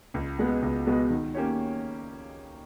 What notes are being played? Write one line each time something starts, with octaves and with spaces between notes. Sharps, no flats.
C#2
B2 G#3 B3
C#2
B2 G#3 B3
D#3
A#3 C#4 G4 C#5